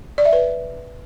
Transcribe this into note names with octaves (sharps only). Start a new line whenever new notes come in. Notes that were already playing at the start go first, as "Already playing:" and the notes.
D5
E5
B4